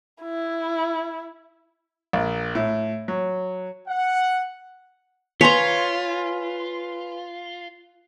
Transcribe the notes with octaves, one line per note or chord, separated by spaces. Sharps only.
E4
A#1
A2
F#3
F#5
F4 B4 C#5 G#5 A#5 C6 B6